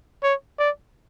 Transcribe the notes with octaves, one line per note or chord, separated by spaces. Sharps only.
C#5
D5